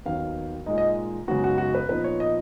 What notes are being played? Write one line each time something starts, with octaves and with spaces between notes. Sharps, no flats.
D#2 D#3 F#3 B3 F5
A#2 G#3 D#4 D#5
D#5
F#2 C#3 G#3 B3 D#4 F#4
F#4
F#4
B4
A#2 F3 B3 D#4 B4
C#5
D#5